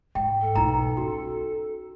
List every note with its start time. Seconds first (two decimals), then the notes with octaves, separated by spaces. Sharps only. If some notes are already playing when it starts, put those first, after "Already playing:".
0.15 G#2 G5
0.42 A4
0.55 B1 D#4 A#5
0.97 C#4 F#4